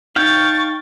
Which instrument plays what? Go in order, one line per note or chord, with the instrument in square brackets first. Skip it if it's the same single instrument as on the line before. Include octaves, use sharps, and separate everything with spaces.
[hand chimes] D#4 [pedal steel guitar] F5 G5 [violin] C#6 A6